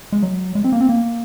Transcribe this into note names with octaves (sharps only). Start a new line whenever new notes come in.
G#3
F#3
G#3
C4
A#3
C4
A#3